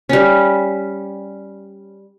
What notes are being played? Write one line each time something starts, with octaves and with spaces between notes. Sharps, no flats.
G3 C#4